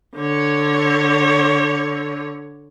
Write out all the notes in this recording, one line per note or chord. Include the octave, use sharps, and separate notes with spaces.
D3 C#5